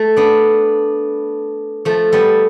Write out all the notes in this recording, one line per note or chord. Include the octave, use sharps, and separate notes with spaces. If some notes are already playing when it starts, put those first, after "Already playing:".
Already playing: A3
B3 D4
F3 A3
G3 B3